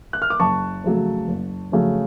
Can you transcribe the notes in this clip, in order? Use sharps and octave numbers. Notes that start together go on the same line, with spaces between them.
F#6
F6
D6
F#1 A5 C#6
F2 C#3 F#3 A3
F#1
F2 C#3 F#3 A3